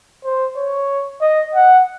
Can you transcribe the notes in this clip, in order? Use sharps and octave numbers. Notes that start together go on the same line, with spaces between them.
C5
C#5
D#5
F#5